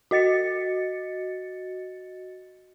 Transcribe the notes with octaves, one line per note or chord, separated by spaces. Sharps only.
F#4 D#5 A6 C#7